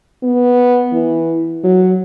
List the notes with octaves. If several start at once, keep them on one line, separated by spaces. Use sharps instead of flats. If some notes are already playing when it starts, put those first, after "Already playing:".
B3
E3
F#3